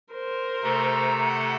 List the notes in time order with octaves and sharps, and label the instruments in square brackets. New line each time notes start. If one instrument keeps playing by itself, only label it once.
[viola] A#4 C5
[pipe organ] C3 A3 A4 [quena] A#5
[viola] F#5